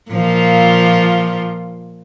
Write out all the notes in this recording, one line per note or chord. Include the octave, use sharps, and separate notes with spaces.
A#2 F3 F4